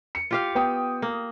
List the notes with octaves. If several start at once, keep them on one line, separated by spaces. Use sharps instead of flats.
C#7
F4 G4 F5
B3 G5 D#6
A#3